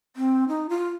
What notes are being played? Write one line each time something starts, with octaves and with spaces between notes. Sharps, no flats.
C4
D#4
F4